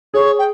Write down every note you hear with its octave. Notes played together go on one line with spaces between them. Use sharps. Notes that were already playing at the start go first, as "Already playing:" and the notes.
G#4 C#5
G5